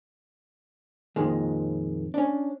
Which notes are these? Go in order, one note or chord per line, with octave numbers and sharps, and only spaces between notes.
F2 A#2 D#3 G#3
C#4 D4